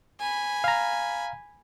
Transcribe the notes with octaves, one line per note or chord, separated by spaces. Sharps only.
G#5 B5
F5 A#5